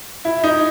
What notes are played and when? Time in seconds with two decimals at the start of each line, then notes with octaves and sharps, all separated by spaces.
0.25 E4
0.44 D#4